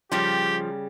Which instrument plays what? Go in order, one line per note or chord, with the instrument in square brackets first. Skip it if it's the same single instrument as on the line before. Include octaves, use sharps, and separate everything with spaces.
[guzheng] C#3 G3 [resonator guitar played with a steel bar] F3 [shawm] G4